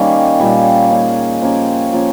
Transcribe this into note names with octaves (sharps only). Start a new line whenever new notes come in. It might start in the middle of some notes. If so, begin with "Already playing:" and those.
Already playing: D#3 G3 A#3 C#4
A#2 G3 C#4 G4
D#3 A#3 C#4 G#4
F3 A#3 C#4 G4
F3 A#3 C#4